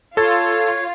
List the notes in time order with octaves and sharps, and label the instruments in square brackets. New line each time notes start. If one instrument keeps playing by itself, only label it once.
[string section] F4 [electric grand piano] A4 A6 [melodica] C#5